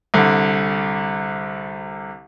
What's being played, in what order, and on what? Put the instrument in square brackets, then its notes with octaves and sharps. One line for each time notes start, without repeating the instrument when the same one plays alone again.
[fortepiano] C2 D3